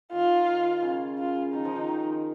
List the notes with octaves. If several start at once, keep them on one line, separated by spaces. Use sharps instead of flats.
D#3 F4
C#3
F4
D#3 D#4
F3
D#3
D#3